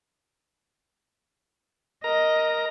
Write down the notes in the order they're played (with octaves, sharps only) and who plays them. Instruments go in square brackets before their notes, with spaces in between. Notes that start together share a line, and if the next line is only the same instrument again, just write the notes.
[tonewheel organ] A#4 A#5 [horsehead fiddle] D#5